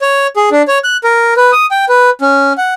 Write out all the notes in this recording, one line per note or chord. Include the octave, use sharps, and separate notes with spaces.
C#5
G#4
D4
C#5
F#6
A#4
B4
D#6
G5
B4
C#4
F#5